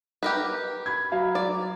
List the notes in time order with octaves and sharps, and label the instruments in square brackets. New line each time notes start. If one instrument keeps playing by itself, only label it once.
[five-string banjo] G4 A#4 B4
[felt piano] B5 G#6
F#3 F5
[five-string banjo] D5